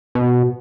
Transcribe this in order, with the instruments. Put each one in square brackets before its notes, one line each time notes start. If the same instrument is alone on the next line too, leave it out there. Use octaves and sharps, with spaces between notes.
[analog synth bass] B2